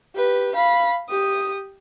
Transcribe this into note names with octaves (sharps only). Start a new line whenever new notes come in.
G4 B4
F5 B5
G4 D#6